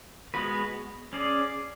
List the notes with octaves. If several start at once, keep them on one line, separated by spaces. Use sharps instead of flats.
G#3 B3 F#4 B4
C#4 G#4 D5